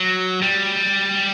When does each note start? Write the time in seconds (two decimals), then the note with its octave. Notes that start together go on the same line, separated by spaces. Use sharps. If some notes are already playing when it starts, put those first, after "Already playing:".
Already playing: F#3
0.42 G3